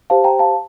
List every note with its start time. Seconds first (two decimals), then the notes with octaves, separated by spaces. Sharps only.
0.10 G4 C5 F5 A5
0.24 G5 A#5
0.39 F5 A5